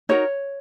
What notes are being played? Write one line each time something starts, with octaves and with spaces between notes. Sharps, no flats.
D#4 F#4 A#4 C#5